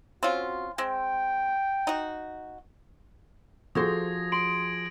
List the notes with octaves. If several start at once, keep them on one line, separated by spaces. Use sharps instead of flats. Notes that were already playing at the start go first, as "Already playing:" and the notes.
C4 C#4 F4 F#4
G#3 C4 G5
D#4 F#4
F3 F#4 G#4 A4 C5 D#6 G#6 A#6
C6 D7 F#7